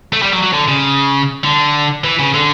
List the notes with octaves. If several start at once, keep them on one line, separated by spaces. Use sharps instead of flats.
A3
G3
F#3
F#3
D3
C#3
D3
E3
C#3
D3